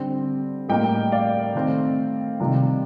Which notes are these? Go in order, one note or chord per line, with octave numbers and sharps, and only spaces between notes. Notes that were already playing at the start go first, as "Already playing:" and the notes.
Already playing: D3 G3 C4
A2 G3 A#3 D#5 G5
D5 F5
D#3 A3 C4
C3 D#3 G3